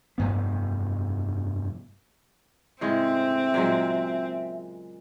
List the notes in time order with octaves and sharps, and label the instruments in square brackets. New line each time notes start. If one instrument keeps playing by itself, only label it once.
[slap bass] F1 G2 B3
[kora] A2 C#3 G#3 [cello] C4 [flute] E5
[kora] A#2 F#3 G#3